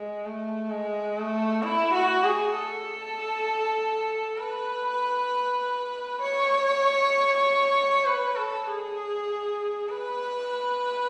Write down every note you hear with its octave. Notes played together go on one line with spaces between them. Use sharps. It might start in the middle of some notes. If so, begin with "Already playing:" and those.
Already playing: G#3
A3
G#3
A3
E4
F#4
G#4
A4
B4
C#5
B4
A4
G#4
B4